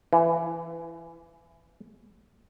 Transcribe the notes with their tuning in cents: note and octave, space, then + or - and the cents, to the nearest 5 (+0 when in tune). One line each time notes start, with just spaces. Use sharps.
E3 +20